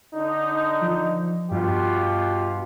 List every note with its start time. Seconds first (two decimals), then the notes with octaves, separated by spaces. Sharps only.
0.14 D3 D#4
0.81 F3
1.51 G2 B2 F4 G4